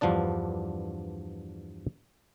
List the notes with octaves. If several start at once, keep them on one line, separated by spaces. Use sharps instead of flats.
E2 G2 F3 B3 D4 D5